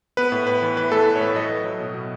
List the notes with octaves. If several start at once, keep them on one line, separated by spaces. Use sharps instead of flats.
B3 B4
A2
A2 B4
E3
E3 B4
A2 A4
A2 B4
C#5
A2 B4
F#3 D#5
F#3
F#3
B2
B2